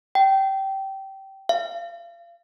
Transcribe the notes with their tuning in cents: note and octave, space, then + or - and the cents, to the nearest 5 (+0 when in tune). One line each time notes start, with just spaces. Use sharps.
G5 -20
F5 -35